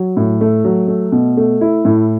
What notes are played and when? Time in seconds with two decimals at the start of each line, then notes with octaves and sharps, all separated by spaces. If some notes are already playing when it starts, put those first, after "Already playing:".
Already playing: F#3
0.17 A2
0.41 A3
0.65 F#3
0.88 A3
1.12 B2
1.37 A3
1.61 E4
1.85 A2